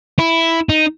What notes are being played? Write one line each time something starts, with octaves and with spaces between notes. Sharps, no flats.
E4
D#4